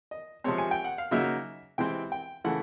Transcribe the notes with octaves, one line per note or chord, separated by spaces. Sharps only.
D#5
C3 F3 G#3 C4 C#5
G#5
G5
F#5
F5
C#3 F#3 A#3 D#4 E5
C3 E3 G#3 C4 G5
G5
C#3 E3 A3 F#5